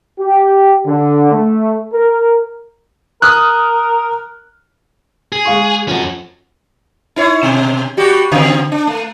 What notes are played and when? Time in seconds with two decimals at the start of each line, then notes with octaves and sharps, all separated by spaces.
0.20 G4
0.86 D3
1.32 A3
1.93 A#4
3.22 A#4 D#6 F6 F#6
5.32 G#4
5.45 G#3 F5 C#6
5.88 F2 C#4 F#4
7.16 D#4 E4 C#5
7.43 B2
7.97 G3 F#4 G4
8.32 C#3 C4
8.72 D4
8.87 A3